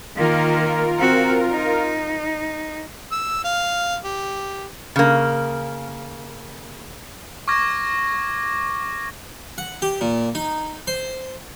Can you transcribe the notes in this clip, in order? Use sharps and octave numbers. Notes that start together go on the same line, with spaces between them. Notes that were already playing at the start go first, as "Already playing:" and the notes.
D#3 A#3 F4 A#4
C4 F#4
D#4
E6
F5
G4
C#3 A#3
C#6 D6 F6 G#6 A#6
F#5
G4
A#2
D#4
C5